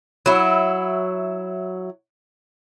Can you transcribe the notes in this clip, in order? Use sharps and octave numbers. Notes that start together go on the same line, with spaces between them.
F#3 E4